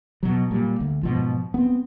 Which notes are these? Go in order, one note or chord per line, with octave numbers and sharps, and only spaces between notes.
B2 F#3
A#2 G3
D2
G#2 B2 F3
B3 C4